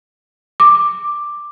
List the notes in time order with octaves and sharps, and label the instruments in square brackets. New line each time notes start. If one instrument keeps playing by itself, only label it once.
[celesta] D6